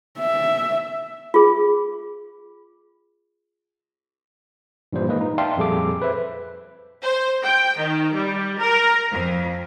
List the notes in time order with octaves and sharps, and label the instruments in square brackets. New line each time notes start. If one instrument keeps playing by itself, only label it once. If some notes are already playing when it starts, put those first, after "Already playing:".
[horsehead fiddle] E5
[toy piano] F4 G#4
[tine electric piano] G2 A#2 E3 G3 C5
G#3 A#3 D#4 B4 D#5
D#4
D5 E5 F5 G5 A5 C6
F2 A#2 G3 G#4 A4 D6
B4 C5 E5
[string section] C5
G5
D#3
G3
A#4
F2